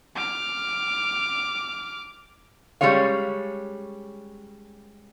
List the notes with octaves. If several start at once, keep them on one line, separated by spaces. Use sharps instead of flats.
D6 F6
G3 G#3 C#4 C#5 F5